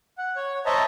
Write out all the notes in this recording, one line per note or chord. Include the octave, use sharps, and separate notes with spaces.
F#5
C#5
C5 C#5 D#5 E5 A5 A#5